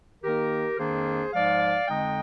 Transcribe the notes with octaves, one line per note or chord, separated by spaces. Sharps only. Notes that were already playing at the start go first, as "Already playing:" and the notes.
D#3 A#3 D#4 G4 A#4
F2 D#3 A#3 D4 G#4 C5
G#2 F3 G#3 D5 F5
F2 D3 G#3 D#4 D#5 G5